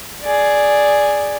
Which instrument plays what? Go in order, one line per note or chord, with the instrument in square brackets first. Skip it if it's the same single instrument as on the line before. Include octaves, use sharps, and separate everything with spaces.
[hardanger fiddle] G#4 D5